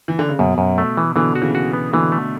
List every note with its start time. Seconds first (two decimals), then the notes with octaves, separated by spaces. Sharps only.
0.08 E3
0.19 D3
0.29 C#3
0.39 F#2 B2
0.58 F#2
0.78 A3
0.97 E3
1.16 B2 D3 E3
1.35 F#4
1.42 C#3 E3
1.55 F#4
1.73 B3
1.93 B2 D3 E3
2.12 A3